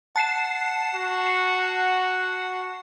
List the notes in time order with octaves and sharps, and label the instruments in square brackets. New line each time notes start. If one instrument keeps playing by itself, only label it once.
[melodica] F#5 [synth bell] A5 C7 E7
[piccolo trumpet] F#4